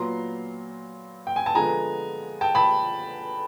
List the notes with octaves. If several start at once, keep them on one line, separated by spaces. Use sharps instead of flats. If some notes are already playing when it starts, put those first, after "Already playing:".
Already playing: A#2 F#3 B3 A#5 C6
G5
G#5
A5
D3 F3 G#3 B3 G#5 A#5
G5 A5
A5 B5